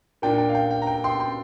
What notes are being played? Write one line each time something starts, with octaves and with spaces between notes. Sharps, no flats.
A#2 A#3 D4 G5
G5
F5
G5
G5
A#5
G5
G5 C6
G5 C6